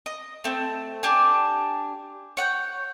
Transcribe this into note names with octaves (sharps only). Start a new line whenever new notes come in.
D#5
A3 C4
D4 G4 G#5
C#5 F#5 G6